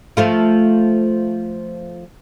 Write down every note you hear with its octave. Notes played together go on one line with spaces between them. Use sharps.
F3 A3 F4